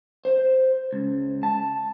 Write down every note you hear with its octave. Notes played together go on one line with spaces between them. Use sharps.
C5
C#2
A5